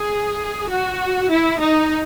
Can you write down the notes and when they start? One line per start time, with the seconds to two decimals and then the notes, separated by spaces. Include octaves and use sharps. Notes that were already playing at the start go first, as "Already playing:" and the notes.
Already playing: G#4
0.68 F#4
1.30 E4
1.60 D#4